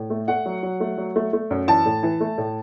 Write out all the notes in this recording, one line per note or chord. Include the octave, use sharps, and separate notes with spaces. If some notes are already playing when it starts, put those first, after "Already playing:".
Already playing: A2
A3
A3 F#5
F#3
F#3
A3
F#3
A3
A3
F#2
E3 A5
A2
E3
A3
A2